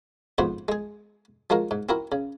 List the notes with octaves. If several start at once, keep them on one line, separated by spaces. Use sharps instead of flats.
F2 G#2 B3 F#4 C5 C6
G#3 G#4
F3 G#3 F#4 A#4
G#2
C4 E4 F#4 A#4
C#3